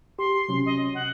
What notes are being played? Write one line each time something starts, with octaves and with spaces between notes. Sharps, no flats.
G4 C6
C3 F#3 C#4
D#5
F#5